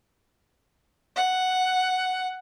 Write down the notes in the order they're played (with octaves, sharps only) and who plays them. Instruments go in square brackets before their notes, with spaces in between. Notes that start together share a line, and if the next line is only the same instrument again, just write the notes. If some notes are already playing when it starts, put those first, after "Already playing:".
[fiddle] F#5